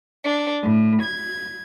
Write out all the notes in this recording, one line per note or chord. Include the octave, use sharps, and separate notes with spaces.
D4
A2
G#6